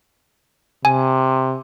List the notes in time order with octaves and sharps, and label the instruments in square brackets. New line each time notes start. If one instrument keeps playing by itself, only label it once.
[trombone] C3 [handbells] G#5